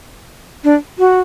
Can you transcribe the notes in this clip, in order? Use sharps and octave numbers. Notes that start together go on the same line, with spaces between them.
D4
F#4